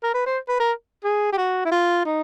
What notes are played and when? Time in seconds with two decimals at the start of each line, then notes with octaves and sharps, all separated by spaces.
0.03 A#4
0.14 B4
0.26 C5
0.48 B4
0.60 A#4
1.04 G#4
1.32 G4
1.38 F#4
1.65 E4
1.72 F4
2.05 D#4